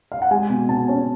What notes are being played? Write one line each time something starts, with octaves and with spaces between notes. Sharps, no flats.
F5
F#5
G#3 G#5
B2
B2 A5
C#4